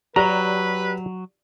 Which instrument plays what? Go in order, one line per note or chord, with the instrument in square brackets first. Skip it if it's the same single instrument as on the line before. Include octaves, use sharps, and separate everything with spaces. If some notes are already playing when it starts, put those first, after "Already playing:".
[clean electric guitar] F#3 [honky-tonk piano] G4 D5 [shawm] B4 [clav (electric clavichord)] A#5